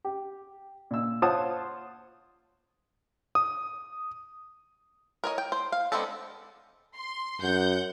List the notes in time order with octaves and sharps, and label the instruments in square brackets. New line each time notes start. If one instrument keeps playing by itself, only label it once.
[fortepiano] G4
A#2 E6
F4 C5 C#5 F#5 A5 D#6
[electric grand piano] D#6
[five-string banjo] A#4 C#5 D#5
G5
C5
F5
G#3 B3 C4 D4 A4
[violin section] C6
[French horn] F#2 [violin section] F#5 G6